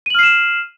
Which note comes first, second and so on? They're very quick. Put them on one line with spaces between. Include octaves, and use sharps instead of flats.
D#7 F#7 F6 C7 E7